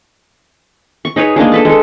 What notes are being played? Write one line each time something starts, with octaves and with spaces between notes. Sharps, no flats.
C#6
D#4 G#4 B4 C#5
G#3 A#3 D4 G#4
A4 B4 A5
G#3 A4